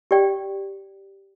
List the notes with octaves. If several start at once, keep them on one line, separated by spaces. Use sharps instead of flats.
G4 D5 G5